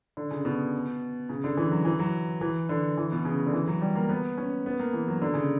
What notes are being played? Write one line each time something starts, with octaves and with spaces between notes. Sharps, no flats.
D3
C#3
B2
C#3
D3
E3
F#3
E3
F#3
E3
D3
E3
B2
C#3
D3
E3
F#3
G3
A#3
B3
C#4
B3
A#3
E3
F#3
D3
C#3